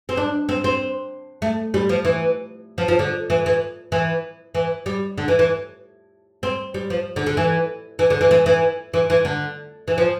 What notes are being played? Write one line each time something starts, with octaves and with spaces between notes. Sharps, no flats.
C4
D4
C4
C4
A3
G3
F3
E3
F3
F3
D3
E3
E3
E3
E3
G3
D3
E3
E3
C4
G3
F3
D3
D3
E3
E3
D3
E3
E3
E3
E3
E3
D3
E3
F3